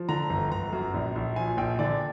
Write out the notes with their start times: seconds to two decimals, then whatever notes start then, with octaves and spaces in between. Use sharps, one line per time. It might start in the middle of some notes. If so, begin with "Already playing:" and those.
Already playing: F3
0.09 D3 A#5
0.30 G1
0.51 G1 A#5
0.73 F#2
0.94 A#1
1.15 A#1
1.36 F3 G#5
1.57 A#1 G5
1.79 D3 D5